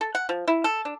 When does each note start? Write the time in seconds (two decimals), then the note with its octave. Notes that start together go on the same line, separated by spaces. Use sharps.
0.01 A4
0.15 F#5
0.29 F3
0.48 E4
0.64 A4
0.85 D4